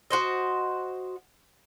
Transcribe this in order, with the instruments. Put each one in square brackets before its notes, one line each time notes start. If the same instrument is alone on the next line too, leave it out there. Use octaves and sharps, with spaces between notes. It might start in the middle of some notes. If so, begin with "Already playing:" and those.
[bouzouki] F#4 C5 D#5